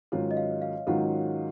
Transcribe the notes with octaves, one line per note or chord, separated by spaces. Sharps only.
G#2 D#3 F#3 C#4 F4 C#5
D#5
F5
F5
G#2 D#3 F#3 C#4 F4 F#5